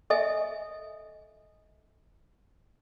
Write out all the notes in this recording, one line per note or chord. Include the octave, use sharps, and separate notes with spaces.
A4 D#5 E5 G#5